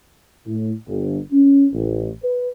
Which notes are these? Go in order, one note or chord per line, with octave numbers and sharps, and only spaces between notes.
A2
G1
C#4
A1
B4